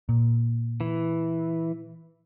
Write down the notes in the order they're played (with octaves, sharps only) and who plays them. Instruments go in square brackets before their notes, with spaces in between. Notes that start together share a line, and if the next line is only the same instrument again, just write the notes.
[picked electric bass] A#2
[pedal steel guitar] E3